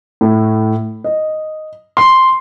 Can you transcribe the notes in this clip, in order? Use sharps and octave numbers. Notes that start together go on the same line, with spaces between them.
A2
D#5
C6